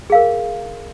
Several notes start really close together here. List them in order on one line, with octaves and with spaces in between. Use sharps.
G#4 F5 A#4